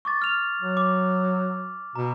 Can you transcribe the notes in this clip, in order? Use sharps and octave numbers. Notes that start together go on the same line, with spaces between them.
C#6 D6 A6
F6 F7
F#3
D6
B2 A#5